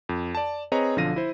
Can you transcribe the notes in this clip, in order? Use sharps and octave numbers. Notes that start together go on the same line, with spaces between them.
F2
D5 A5
C4 G#4 B4 C#5 D#5 A#5
B1 D3 F3 F5 A#6 D#7
E4 C5